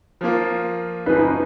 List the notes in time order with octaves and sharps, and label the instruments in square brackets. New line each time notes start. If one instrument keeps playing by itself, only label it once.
[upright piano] F3 A#3 F4
[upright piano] F#2 C#3 F3 G#3 D#4 [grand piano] B4